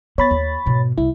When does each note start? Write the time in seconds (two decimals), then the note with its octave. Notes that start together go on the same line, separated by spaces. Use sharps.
0.18 B3 C#5 B5 A6
0.31 D#2
0.66 G#2 B2
0.98 C2 E4